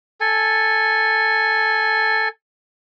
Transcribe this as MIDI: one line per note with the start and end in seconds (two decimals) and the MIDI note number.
0.21 2.29 69
0.21 2.29 80